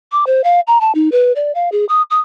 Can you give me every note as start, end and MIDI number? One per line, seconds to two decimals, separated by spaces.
0.12 0.25 86
0.27 0.43 72
0.44 0.60 77
0.67 0.79 82
0.81 0.92 81
0.95 1.09 63
1.12 1.33 71
1.36 1.52 74
1.55 1.69 77
1.72 1.85 68
1.89 2.02 87
2.11 2.20 87